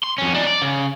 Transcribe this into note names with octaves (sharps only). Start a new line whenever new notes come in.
C6
F2 C#4
D4 D#4
D5
C#3